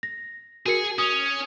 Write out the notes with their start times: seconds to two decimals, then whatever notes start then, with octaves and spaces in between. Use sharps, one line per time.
0.03 A#6
0.66 F#4 G#4 A#4 C#7
0.98 C#4 D#6 F7